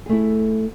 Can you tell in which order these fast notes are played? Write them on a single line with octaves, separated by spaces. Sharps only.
G#4 A3 E4